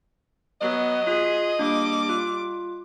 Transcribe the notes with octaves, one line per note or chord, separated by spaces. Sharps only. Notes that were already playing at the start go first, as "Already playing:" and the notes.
F#3 B3 D#5
F4 G#4
G3 A#3 D4 D6
F4